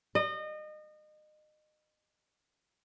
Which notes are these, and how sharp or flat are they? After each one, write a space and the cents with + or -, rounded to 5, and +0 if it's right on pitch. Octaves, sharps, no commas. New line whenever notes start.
D#5 -30